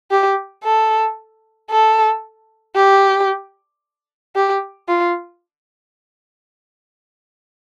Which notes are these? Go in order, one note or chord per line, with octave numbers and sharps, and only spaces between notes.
G4
A4
A4
G4
G4
F4